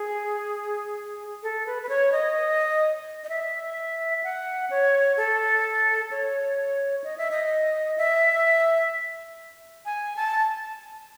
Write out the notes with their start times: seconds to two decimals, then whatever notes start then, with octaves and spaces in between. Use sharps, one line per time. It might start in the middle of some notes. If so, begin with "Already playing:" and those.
Already playing: G#4
1.43 A4
1.67 B4
1.82 B4
1.89 C#5
2.12 D#5
3.24 D#5
3.29 E5
4.24 F#5
4.70 C#5
5.17 A4
6.11 C#5
7.04 D#5
7.18 E5
7.31 D#5
7.98 E5
9.85 G#5
10.16 A5